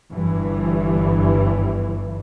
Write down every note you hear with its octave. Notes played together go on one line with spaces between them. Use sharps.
G1 G2 E3